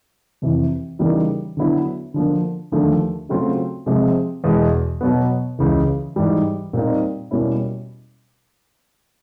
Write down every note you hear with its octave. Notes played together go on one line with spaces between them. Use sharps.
F2 C3 E3
C#3 E3 G3 A#3 D#4
D3 F#3 B3 E4
D3 F3 A#3
D#2 D3 F3 A3
C#3 F#3 A3 C4 F4
C3 F3 G#3 C4
E2 B2 G#3
B2 F#3 B3
C#2 C#3 E3
G#2 E3 G3
A#2 G3 C4 D#4
B2 G3 A#3 C#4 E4